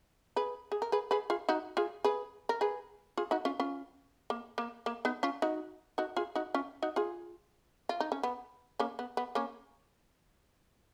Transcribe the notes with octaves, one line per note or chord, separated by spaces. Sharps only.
G#4 B4
G#4
A#4
G#4 B4
G#4 B4
F4 G#4
D#4 F#4
F4 G#4
G#4 B4
A#4
G#4 B4
F4 G#4
D#4 F#4
C#4 F4
C#4 F4
A#3
A#3
A#3
B3 D#4
C#4 F4
D#4 F#4
D#4 F#4
F4 G#4
D#4 F#4
C#4 F4
D#4 F#4
F4 G#4
F4
D#4
C#4
B3
A#3 C#4
B3
B3
A#3 C#4